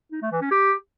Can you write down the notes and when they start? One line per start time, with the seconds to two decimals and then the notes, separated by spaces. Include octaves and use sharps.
0.12 D#4
0.22 A3
0.32 E3
0.41 C#4
0.51 G4